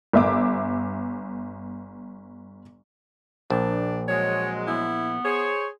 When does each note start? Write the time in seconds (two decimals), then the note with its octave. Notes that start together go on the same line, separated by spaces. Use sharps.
0.13 G1 E5 D6
3.50 A#1 D4
4.08 F#3 G#3 C#5
4.67 B3 E4
5.25 G#4 C5 C#5